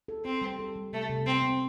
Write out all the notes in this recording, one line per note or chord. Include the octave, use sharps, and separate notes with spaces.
A4
C4 A4
G3
A4
G3
C3 A3
C3
C3 C4
C4